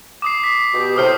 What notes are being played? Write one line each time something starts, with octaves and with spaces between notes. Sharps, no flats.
D6 D#6 C7
B6
B2 G4
A2 C3 C5 D#6 F6 C7